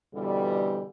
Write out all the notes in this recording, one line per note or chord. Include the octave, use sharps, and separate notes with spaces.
F2 B2 D3 E3 G3